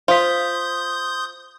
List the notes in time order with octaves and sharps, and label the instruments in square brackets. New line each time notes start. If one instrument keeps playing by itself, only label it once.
[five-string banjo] F4 [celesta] C5 B6 [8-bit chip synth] C6 D#6 G6